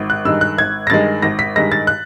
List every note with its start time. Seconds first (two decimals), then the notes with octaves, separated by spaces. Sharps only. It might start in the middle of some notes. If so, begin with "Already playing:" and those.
Already playing: G#1
0.10 F#6
0.25 G2 D#3 G#3 E6
0.41 F#6
0.58 G#1 G#6
0.87 A#6
0.90 G2 D#3 G#3 A6
1.22 G#1 A#6
1.39 B6
1.56 G2 D#3 G#3 A#6
1.72 A6
1.87 F#6